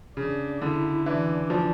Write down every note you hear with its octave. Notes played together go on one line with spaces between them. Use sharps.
C#3 D4
D3 E4
E3 D4
F3